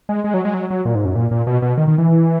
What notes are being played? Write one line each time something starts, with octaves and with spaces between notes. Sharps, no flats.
G#3
G#3
F#3
G#3
F#3
F#3
A#2
G#2
F#2
A#2
A#2
B2
B2
D#3
D#3
E3